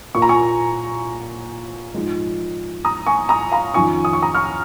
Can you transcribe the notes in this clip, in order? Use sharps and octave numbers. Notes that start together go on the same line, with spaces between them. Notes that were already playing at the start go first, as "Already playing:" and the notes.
A#2 A#3 F4 C#6
A#5
G#5 C#6
G#2 F3 G#3
A#5 D#6
G#5 C#6
A#5 D#6
F5 A#5
F2 D#3 C#4 F4 G#5 C#6
D#6
C#6
A#5 D#6
C#6 F6